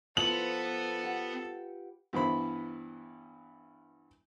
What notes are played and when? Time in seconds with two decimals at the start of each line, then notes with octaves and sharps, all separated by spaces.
0.17 F3 B3 A4 B4 C6 F#7
1.03 G4 F#5
2.13 G2 E3 B3 E4 C5 B5